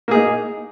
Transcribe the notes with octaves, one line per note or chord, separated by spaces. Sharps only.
A#3 D#4 G#4